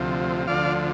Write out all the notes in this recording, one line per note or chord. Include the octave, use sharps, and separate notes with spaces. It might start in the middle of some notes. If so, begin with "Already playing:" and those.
Already playing: D2 C3 F3
D2 D3 F3 D5 F5